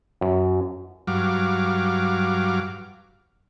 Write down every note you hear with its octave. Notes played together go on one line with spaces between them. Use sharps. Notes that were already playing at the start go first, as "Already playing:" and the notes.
F#2
G2 F#3 F5 D6